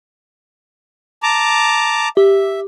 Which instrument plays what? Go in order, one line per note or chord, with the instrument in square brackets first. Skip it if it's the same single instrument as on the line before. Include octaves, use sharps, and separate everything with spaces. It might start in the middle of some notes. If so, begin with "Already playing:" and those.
[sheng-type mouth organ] A5 A#5 D6
[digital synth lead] G4 [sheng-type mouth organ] E5